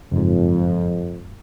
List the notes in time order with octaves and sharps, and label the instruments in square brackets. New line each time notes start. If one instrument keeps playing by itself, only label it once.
[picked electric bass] F#1 G#2 [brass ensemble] F2